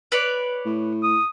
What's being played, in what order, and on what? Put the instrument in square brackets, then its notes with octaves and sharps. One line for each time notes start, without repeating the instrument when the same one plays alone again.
[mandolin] B4 C#5 D5
[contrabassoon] A2
[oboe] D#6